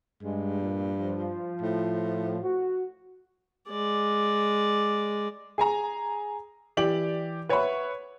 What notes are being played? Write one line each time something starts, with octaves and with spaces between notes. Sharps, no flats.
G2 G#3
A#2
F3
A2
F#4
G#3 D5
G#4 G#5 A#5
E3 G4 D5 F#7
B4 C#5 E5 F#5 B5